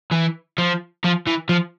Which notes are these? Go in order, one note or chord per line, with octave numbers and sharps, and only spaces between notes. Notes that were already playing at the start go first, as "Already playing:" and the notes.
E3
F3
F3
E3
F3